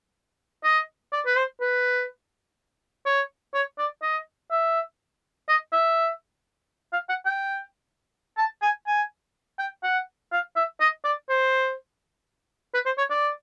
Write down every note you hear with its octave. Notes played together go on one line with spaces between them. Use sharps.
D#5
D5
B4
C5
B4
C#5
C#5
D5
D#5
E5
D#5
E5
F5
F#5
G5
A5
G#5
G#5
G5
F#5
F5
E5
D#5
D5
C5
B4
C5
C#5
D5